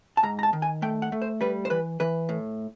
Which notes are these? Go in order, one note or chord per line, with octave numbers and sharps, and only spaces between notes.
A5
G#2 A#5
A#5
A5
D#3
G#5
A3 G5
F#5
A3
C5
G3 B4
C5
E3 B4
E3 B4
A2